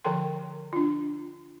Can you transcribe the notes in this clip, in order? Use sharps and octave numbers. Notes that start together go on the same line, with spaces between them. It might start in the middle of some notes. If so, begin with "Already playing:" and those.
D3 F3 A4 A#4 G5 C6
D4 F4